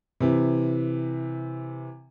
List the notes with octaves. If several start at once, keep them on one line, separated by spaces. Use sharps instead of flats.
C3 E3